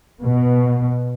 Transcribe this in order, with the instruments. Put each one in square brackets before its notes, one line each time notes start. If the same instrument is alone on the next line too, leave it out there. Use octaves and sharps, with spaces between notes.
[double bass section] B2